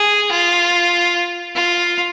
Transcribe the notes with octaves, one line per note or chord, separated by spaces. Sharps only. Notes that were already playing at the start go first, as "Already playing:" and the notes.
Already playing: G#4
F4
F4